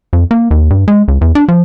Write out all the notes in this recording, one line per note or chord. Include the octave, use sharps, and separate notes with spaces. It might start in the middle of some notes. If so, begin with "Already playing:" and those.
F2
A#3
D#2
G2
G#3
C#2
E2
D4
F3